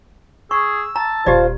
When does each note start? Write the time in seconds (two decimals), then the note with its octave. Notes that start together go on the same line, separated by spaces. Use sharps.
0.51 G#4 C#6 E6
0.96 A5 A#5
1.26 D#1 F4 G4 C5 D5